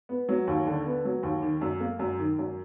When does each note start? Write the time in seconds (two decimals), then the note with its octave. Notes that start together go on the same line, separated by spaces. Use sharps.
0.09 B3
0.29 F#3
0.47 D#2
0.67 D3
0.85 B3
1.05 F#3
1.23 D#2
1.42 D#3
1.61 F#2
1.80 A#3
1.99 F#2
2.19 D#3
2.39 F#2